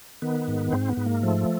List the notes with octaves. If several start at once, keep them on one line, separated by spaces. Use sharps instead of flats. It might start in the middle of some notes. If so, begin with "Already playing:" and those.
D#3 B3
G#2
G#2 C4
B3
G#2
A#3
F3 A3